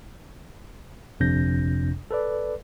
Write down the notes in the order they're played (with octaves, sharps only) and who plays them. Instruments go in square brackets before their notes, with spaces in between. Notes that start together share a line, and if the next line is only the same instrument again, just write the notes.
[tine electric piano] G1 F2 C3 D4 G6 A#6
A4 B4 D5